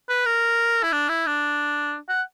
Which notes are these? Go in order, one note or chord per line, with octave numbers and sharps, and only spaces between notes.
B4
A#4
E4
D4
E4
D4
F#5